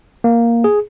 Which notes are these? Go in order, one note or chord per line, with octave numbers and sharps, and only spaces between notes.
A#3
G#4